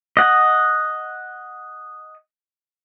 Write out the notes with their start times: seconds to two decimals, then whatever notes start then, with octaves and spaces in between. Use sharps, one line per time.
0.17 D#5 F#5